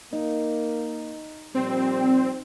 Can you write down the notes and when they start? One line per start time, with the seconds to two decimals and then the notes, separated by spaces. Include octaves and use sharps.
0.13 A#3 D#4
1.55 A#2 F3 G3 C4